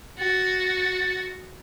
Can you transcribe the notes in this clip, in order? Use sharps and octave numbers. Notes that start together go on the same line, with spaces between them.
F#4 A6